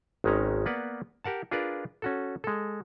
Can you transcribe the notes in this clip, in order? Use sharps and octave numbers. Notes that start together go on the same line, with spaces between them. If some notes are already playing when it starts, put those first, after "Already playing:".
G#1 D#3 G#3 C#4 A#5
A#3 B3 B4 D5 F#5
G4 A#4 F#5 A5
D4 F4 G#4 A#4 B4 D5
C#4 F#4 A4
G#3 A4